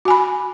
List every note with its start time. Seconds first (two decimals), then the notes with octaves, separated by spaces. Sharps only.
0.05 F#4
0.08 G#5
0.10 B5